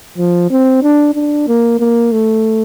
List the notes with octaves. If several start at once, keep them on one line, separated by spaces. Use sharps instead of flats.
F3
C4
D4
D4
A#3
A#3
A3